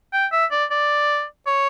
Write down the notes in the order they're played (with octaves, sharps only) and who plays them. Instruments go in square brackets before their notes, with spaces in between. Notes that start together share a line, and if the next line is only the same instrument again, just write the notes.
[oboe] G5
E5
D5
D5
C#5